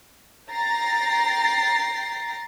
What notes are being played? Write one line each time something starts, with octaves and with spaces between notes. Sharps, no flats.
G5 A#5 A6 A#6 C7